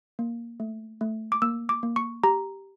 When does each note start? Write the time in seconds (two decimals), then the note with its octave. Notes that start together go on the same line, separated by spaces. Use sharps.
0.19 A#3
0.60 A3
1.01 A3
1.32 D6
1.42 A#3 E6
1.69 D6
1.83 A#3
1.96 C#6
2.24 G4 A#5